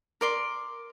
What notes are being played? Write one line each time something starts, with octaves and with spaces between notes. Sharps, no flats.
A#4 D5 C6